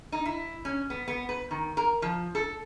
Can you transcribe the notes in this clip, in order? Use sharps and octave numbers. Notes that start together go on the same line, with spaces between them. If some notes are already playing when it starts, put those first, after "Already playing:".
D#4
E4
C#4
B3
B3
B4
D#3
A#4
F3
A4